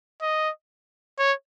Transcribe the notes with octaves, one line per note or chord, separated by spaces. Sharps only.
D#5
C#5